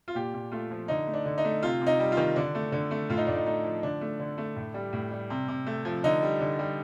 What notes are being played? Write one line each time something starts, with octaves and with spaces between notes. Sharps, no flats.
F4
A#2 G4
A#2
A3 F4
F3
D3 D#4
A3
D4
D3
D#4
A3
C3 F4
C3
D#4
G3
F4
D#3
D3 D4
A3
D3
A3
A2 F4
D#4
A2 D4
D#4
A3 D#4
F3
D3 D4
A3
D3
A3
A2
G3
A2
G3
C3
C3
A3
F3
D3 D#4
G3
D3
G3